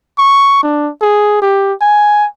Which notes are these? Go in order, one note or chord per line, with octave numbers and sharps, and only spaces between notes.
C#6
D4
G#4
G4
G#5